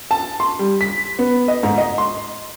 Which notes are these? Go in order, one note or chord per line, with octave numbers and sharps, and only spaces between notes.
A5
C6
G3
B6
B3
D#5
G#2
D#5
C6